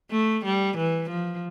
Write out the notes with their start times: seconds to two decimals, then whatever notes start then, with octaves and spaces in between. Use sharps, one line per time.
0.11 A3
0.45 G3
0.77 E3
1.10 F3